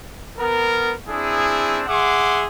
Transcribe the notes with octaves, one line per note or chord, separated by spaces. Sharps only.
B3 A#4
C4 D4 E4 G#4
G#4 E5 F#5 C6 D6